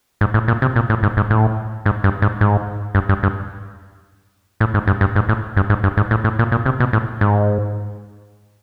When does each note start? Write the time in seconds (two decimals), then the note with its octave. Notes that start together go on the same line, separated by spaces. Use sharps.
0.21 G#2
0.34 A2
0.48 A#2
0.62 C3
0.76 A#2
0.90 A2
1.03 G#2
1.17 G#2
1.30 A2
1.86 G#2
2.04 G2
2.22 G#2
2.41 G#2
2.95 G2
3.09 G2
3.23 G2
4.60 A2
4.74 G#2
4.87 G2
5.01 G2
5.16 G#2
5.29 A2
5.57 G2
5.70 G#2
5.84 G2
5.97 G#2
6.11 A2
6.24 A2
6.39 A#2
6.52 A#2
6.66 C3
6.80 B2
6.93 A2
7.21 G#2